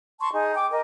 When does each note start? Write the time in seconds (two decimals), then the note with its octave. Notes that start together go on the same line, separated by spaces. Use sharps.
0.20 A5 C6 C#6
0.33 D#4 G#4
0.55 G5 D6
0.70 A#4 D#5